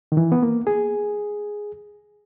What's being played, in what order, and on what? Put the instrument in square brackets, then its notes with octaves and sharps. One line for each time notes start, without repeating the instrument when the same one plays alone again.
[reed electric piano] D#3
E3
B3
A#3
G#4